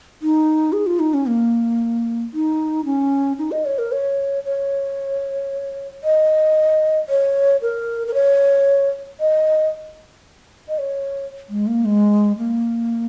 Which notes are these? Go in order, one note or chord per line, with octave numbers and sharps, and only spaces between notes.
D#4
G#4
F4
D#4
C#4
A#3
D#4
C#4
D#4
D#5
C#5
A#4
C#5
C#5
D#5
C#5
A#4
A#4
C#5
D#5
D#5
C#5
G#3
A#3
G#3
A#3